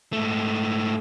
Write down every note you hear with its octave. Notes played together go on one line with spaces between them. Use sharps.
G#2 A3